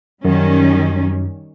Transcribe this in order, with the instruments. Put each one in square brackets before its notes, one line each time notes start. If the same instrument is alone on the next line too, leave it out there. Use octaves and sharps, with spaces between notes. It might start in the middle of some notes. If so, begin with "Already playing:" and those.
[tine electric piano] F#2 [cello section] D#3 G3 C#4